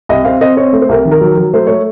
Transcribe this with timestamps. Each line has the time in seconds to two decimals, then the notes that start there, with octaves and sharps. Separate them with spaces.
0.09 C2 D#5
0.25 C4 F5
0.41 C4 D#5
0.57 C4 C#5
0.73 A3
0.82 C5
0.89 C2 A#4
1.05 D#3
1.11 A#4
1.21 F#3
1.37 F#3
1.53 A3 C5
1.67 A3 C#5